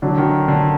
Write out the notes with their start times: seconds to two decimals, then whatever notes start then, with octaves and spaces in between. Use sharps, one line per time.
0.02 D3 F#3 D4 F#4
0.18 D#3
0.48 D3